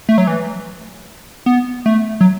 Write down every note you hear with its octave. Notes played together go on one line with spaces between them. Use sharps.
A3
F#3
E3
B3
A3
F#3